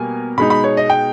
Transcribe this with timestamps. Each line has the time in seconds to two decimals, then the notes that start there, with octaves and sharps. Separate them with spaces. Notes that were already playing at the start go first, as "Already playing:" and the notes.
Already playing: B2 G3 A#3 G#5
0.38 B2 G#3 D#4 B5
0.50 B5
0.64 C#5
0.77 D#5
0.90 G5